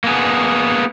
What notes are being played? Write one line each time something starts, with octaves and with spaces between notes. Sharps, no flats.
A#3 B3 G#4